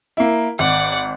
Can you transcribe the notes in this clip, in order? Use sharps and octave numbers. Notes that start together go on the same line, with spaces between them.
A#3 E4
G#1 D5 F#5